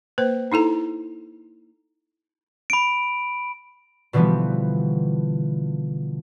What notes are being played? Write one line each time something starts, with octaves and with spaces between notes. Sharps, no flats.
A#3 B4 C5
D#4 E4 A4 A#5
B5 D7
B2 D3 E3 F3 G3 B3